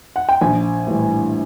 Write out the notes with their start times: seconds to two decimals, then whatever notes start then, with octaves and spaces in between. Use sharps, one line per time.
0.16 F#5
0.29 G5
0.41 A#1 G#5
0.87 A2 E3 G3